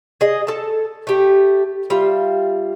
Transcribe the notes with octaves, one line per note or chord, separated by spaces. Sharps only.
G#4 D#5
A4 A5
A3 G4
G3 F4 E5